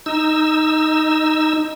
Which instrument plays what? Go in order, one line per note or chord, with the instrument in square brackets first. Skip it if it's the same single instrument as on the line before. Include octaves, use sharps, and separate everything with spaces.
[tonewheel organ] D#4 E6